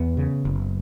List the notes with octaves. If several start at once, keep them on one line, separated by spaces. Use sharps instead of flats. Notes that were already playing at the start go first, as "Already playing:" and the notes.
Already playing: E2 B3
C#3
F#1